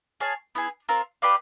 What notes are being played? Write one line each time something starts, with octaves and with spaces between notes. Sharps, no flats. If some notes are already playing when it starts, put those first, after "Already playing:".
G#4 C#5 F5 A5
B3 E4 G#4
C4 F4 A#4
G4 B4 D5 F5